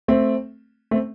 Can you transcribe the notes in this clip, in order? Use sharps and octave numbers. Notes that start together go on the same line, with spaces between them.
A3 C4
A3 C4